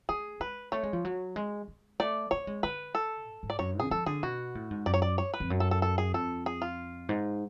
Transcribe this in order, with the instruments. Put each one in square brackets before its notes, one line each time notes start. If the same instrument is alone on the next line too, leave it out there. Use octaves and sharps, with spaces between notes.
[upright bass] A3 [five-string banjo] G#4
[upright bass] G#3 [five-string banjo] B4
[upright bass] A3 [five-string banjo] C#5
[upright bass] G#3
F3
F#3
G#3
G#3
[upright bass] A3 [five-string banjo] D5
[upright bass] A3 [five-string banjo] C#5
[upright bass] G#3
[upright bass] D3 [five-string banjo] B4
[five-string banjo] A4
[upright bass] G#2
G#2
[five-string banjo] D5
[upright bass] F#2 [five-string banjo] C#5
[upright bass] D3 [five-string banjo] G#4
[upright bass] F3 [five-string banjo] A4
[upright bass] D3 [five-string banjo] G#4
[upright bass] B2 [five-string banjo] F#4
[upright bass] A2
G#2
[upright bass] F#2 [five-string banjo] D5
[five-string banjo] C#5
D5
C#5
B4
[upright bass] F2
F#2
[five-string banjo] A4
A4
A4
G#4
[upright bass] F2 [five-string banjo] A4
[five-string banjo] G#4
F4
[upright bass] G#2